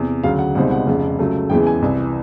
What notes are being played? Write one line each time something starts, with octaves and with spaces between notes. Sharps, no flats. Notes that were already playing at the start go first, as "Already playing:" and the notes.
Already playing: E2 C3
D2 C#3 F#3 F5
F#5
C#2 B2 G3 C4 D#4 F#5
F#5
F1 F2 C#3
C#2 C#3 F#3 A3
E2 C#3 E3 G#3 G5
G#5
C2 C3 E3